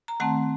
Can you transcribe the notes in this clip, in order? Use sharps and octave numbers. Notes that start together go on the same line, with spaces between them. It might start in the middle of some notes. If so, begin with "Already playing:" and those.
A#5
D#3 A3 C4 F#5 A5